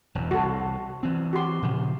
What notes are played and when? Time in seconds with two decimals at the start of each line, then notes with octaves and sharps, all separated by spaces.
0.15 E1 E2
0.31 C2 F#4 A4
1.03 E3 C4
1.33 F#4 G4 C6
1.62 A#2 C#3 F3